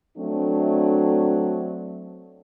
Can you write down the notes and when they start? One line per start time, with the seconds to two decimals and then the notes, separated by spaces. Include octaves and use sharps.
0.17 F#3 A3 C4 D4